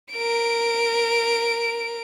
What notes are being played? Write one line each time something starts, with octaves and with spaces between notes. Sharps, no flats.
A#4 D7